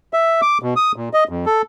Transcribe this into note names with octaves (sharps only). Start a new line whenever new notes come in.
E5
D6
B2
D#6
A#2
D#5
F2
A4